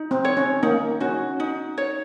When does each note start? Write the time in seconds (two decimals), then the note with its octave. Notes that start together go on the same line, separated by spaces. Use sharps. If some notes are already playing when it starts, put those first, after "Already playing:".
Already playing: D#4
0.11 C4
0.25 C#5
0.37 C#4
0.63 A#3 D#4
1.00 C#4 F#4
1.40 D#4
1.78 C#5